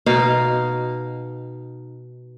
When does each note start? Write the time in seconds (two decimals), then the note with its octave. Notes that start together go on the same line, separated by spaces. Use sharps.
0.06 B2 D#4 F5